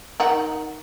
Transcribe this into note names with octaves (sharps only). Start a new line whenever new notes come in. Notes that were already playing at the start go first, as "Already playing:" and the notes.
D#3 D#4 F#5